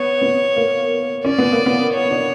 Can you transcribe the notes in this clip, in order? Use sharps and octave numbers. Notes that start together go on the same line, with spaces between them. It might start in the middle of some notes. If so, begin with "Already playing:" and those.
Already playing: B3 C#5
B3
A#3
C#4 D5
B3
A#3
B3
C#5
D4